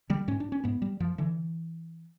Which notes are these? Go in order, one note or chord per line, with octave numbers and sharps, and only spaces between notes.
D3 G3
G#2 C#4
D4
C#4
G#2 B3
G3
F#2 F3
D3 E3